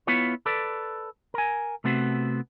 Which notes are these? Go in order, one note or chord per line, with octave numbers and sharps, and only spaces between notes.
B3 E4 F4 B4 C#5
A4 B4 D5
A#4 G#5
C3 A3 B3 C4 F#4